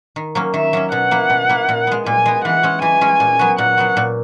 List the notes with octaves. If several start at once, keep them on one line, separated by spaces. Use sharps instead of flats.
D#3
F#3 A#3 C#4
D#3 E5
F#3 A#3 C#4
B2 F#5
A#3 E4
B2
A#3 E4
A#2
G#3 B3
A#2 G#5
G#3 B3
E3 F#5
G#3 C#4
E3 G#5
G#3 C#4
A#2
F#3 B3 F#4
A#2 F#5
F#3 B3 F#4
A#2